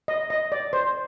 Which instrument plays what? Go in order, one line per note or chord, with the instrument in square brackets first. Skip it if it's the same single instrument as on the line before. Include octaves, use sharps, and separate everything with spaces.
[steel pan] D#5
D#5
D5
C5